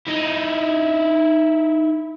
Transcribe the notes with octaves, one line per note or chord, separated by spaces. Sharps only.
D#4 E4